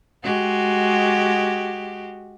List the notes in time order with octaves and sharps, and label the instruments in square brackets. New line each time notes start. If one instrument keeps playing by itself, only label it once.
[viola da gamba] G#3 F#4 G4